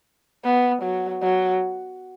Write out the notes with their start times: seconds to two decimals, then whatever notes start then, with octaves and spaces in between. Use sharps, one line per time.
0.44 B3
0.82 F#3
1.22 F#3